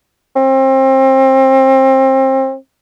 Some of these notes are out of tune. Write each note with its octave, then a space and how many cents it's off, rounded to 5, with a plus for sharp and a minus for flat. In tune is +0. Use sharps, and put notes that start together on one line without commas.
C4 +30